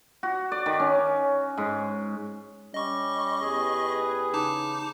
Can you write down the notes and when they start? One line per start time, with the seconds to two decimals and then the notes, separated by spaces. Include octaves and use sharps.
0.23 F#4
0.52 D5
0.66 D#3
0.80 C#4
1.57 G#2
2.74 G3 C#4 D#5 C#6
3.41 E2 G4 G#4 B4
4.34 C#3 D#4 A5 D6